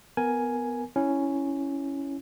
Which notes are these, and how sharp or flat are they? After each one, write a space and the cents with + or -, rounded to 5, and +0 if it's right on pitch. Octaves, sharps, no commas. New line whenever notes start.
B3 +15 A#4 +0 G#5 +5
C#4 +0 E4 +0